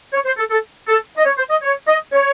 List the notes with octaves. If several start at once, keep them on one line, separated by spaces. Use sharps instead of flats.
C#5
C5
A4
A4
A4
D#5
C#5
C5
D#5
C#5
D#5
C#5